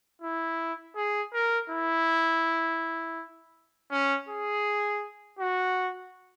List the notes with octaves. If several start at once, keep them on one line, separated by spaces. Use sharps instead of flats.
E4
G#4
A#4
E4
C#4
G#4
F#4